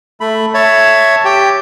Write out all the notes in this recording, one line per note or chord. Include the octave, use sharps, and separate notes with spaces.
A3 B5
C#5 E5 A5
G4 G5